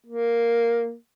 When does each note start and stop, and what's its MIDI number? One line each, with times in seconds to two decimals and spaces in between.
0.06 0.95 58